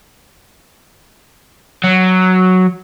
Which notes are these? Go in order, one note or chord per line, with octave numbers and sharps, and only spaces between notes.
F#3